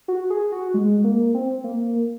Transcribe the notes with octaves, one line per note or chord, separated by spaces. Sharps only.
F#4
G#4
F#4
G#3
A#3
C4
A#3